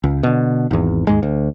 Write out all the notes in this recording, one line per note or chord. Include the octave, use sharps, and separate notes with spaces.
C#2
B2 D3
G#1 E2
D#2 G#2 G#3
D2